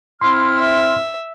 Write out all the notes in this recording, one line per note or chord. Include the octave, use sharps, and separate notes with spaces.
C4 E4 C6 F6
E5